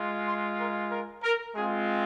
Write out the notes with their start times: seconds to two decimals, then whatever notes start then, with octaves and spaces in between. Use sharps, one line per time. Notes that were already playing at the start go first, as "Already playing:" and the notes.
Already playing: G#3 F4
0.26 C6
0.59 A#4
0.91 A#4
1.23 A#4
1.56 G#3 C4 F4 G#4